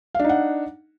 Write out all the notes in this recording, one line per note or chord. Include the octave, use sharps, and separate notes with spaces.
D4 D#4 F5 F#5